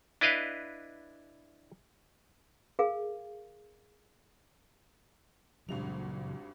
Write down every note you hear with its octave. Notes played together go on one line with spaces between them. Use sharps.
D4 E4 B4 D#5 F5
G#4 A#4 F5
G#1 G2 A#2 C#3 F#3 F7